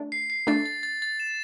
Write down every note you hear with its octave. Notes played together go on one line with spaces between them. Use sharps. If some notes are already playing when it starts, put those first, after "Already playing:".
Already playing: A3 D4
C7
C7
A3 D4 A6
A6
A6
A6
E7